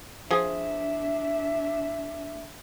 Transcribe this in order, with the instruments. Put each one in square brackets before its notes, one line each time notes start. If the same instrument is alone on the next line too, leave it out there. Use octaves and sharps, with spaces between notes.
[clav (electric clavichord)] F3 G#4 [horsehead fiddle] D4 E5